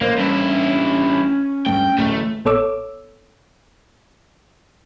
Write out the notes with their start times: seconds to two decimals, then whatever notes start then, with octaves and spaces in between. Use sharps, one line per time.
0.01 A1 A#3 C5
0.18 G2 C#4 E4
1.66 D2 G2 A3 G5
1.98 D1 A1 A3
2.45 A1 B3 A4 C#5 D6 E6